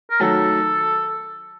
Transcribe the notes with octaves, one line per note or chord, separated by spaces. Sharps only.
A#4
D#3 F#3 A3 A4